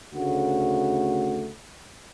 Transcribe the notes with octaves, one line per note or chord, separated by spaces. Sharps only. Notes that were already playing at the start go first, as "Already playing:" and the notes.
D2 C#3 A3 F#4